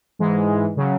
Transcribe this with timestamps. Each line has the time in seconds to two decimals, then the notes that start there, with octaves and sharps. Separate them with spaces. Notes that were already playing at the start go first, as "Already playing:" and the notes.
0.19 G#2 E3 G#3
0.77 C#3 F#3